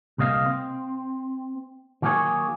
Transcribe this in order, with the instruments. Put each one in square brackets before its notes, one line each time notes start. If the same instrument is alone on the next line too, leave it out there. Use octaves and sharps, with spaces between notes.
[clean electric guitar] C2 C3 A#3 D#5 F5
C4
D#3 F#3 A#3 C#4 G#4 C#5